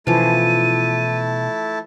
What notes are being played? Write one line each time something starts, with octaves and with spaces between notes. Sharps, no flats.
B2 E3 F3 A3 C#4 E4 A5 D#7